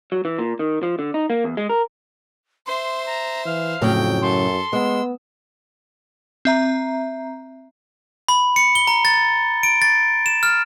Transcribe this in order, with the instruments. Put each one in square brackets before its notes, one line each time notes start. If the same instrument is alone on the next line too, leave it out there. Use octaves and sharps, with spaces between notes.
[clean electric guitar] F#3
E3
A#2
D#3
F3
D3
D#4
A#3
E2
G#3
A#4
[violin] C5 E5 [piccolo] C6
[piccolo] A#5
[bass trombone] E3 [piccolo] F5
[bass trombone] F2 [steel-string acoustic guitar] A2 C#3 F#3 [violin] G5
[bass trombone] F#2 [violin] A4 [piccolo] C6
[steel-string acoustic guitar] G#3 [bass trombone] B3 [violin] E6
[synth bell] C4 E5 A#5
[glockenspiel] B5
C#7
G7
A#5
A6
D7
A6
E7
F6